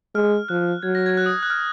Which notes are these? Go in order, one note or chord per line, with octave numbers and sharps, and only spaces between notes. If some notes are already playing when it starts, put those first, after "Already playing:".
G#3 F6
F3 F#6
F#3 G#6
A#6
G#6
F#6
D#6
F#6
F6